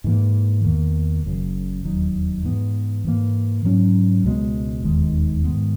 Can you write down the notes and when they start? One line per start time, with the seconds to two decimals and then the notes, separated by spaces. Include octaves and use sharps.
0.04 G#2 E3 A#3
0.64 E2 D#3 A#3
1.24 F#1 F#2 C#3
1.85 E1 D#2 D#3 F#3
2.44 G#2 E3 B3
3.05 G#2 E3 A#3
3.64 G#2 F#3 C#4
4.25 C#2 B2 G#3 B3
4.84 E1 D#2 D#3 G#3
5.44 G#2 D#3 G#3 B3